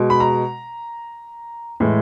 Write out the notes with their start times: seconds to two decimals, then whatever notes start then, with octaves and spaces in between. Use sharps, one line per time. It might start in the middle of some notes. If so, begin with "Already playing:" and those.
Already playing: B2 G#3
0.10 B5
0.20 A#5
1.80 A2 E3 G#3